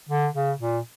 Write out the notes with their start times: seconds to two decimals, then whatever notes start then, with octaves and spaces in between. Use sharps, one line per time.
0.09 D3
0.34 C#3
0.60 A#2